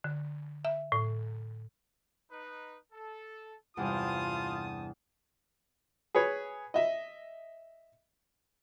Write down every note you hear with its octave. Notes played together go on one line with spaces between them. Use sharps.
D3
E5
A2
D#4 B4
A4
E2 G2 C3 F4 C5 A5 D#6
G#4 B4 C#5
D#5 E5